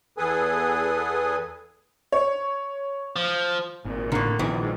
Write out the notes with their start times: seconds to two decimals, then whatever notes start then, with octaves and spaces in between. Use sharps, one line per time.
0.18 E2 G#4 A4 B4 G#5 D#6
2.12 C#5
3.16 F3
3.85 G#1 A#2
4.12 A2 D3 A#3
4.39 A#1 E2 D#3 E3
4.60 G#2